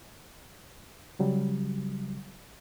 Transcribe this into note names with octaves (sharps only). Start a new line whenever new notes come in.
C#3 F#3 G3